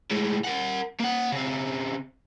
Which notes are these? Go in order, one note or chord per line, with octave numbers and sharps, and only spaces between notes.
A2 G#3
A#4 F#5
A#3 F#5
C#3 C4